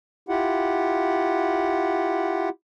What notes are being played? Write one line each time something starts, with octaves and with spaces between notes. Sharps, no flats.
E4 F4 G4 F#5